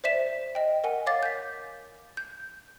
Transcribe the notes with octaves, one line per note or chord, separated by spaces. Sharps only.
C5 D5 E5 B6 E7
D#5 G5
A#4 F#5 G#5
C#5 F5 D6 A6
G6 B6
G6